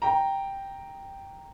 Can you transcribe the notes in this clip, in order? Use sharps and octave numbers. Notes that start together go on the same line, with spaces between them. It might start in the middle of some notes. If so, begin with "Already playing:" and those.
G5 A#5